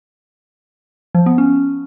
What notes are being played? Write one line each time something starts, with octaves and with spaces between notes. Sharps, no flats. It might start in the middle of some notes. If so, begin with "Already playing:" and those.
F3
B3
C#4